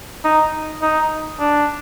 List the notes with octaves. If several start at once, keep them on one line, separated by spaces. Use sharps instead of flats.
D#4
D#4
D4